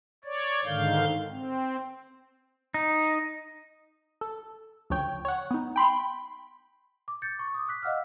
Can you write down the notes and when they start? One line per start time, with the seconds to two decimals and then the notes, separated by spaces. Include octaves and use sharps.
0.24 C#5 D5
0.65 G#2 D3 D#3 F5 G6
1.30 C4
2.74 D#4
4.21 A4
4.90 D2 C#3 F3 C#5 G5
5.25 C#5 F#5
5.51 B3 D#4
5.76 G5 B5 C6
7.08 D6
7.22 D6 G6 A6 C#7
7.39 C#6
7.54 D6 D#6
7.68 D6 F#6 B6
7.82 D#5 F5 F#5 E6 F6